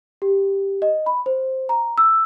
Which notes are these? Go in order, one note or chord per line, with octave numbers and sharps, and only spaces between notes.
G4
D#5
B5
C5
A#5
E6